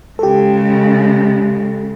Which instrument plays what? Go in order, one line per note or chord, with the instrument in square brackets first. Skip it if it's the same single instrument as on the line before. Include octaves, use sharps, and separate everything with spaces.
[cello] C#3 G#3 [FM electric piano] G4 A4